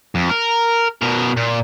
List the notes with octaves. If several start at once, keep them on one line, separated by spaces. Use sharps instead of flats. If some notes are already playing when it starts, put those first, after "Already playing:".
F2
A#4
B2 A#4
A#2